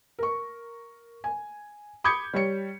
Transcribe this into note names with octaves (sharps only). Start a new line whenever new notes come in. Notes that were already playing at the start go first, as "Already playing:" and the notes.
A#4 C#6
G#5
B5 D6 D#6 G6 G#6 C#7
G3 C#5 C#7